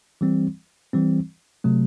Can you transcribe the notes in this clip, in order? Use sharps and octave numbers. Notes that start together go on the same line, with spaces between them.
E3 G3 C4
E3 G3 C4
C3 F#3 A3